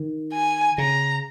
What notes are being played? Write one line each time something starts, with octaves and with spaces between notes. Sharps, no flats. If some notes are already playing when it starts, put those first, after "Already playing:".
Already playing: D#3
G#5
C#3 A#5